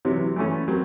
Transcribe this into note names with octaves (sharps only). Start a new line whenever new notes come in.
C3 E3 F#3
E3 A3 C#4
F#3 A#3 C4